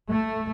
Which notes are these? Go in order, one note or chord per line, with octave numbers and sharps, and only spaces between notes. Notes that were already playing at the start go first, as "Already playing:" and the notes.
A3